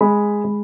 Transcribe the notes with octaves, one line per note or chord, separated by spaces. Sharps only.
G#3 B5
G#3